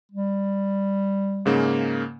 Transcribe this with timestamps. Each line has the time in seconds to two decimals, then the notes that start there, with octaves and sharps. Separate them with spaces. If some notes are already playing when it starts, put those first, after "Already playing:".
0.12 G3
1.46 G#2 C#3 A#3